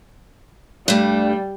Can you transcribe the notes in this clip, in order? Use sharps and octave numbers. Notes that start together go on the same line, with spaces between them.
G2 G3 A3